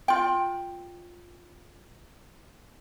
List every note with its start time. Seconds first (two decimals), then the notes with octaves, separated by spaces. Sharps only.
0.08 F4 G5